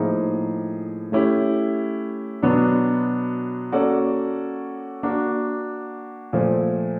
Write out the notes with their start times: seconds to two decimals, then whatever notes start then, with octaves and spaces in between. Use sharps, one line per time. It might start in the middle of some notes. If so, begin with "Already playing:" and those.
Already playing: A2 F3 A#3 D#4 G#4
1.12 A3 C#4 E4 G4
2.42 B2 F#3 B3 D4
3.72 A#3 C#4 F#4 A4 D5
5.03 A#3 D4 F#4
6.33 A#2 F3 A3